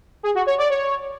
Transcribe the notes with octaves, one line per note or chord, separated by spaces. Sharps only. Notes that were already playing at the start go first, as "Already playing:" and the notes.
G#4
F#4
C#5
D5
C#5